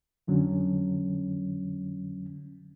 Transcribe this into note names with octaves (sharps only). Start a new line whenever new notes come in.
F2 D3 F#3 C#4